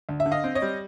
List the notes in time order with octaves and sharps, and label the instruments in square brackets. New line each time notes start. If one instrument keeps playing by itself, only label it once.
[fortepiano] D2
E5
D3
D#5 F5
C4
C#5 D#5
G3